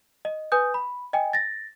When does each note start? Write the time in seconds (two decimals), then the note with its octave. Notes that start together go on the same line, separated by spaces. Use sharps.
0.25 D#5
0.52 B4 G#5 D#6 G6
0.74 B5
1.13 D#5 G5 G#5
1.33 A6 A#6